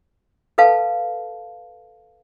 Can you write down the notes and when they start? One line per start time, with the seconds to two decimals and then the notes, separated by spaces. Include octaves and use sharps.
0.58 A4 B4 F5 A5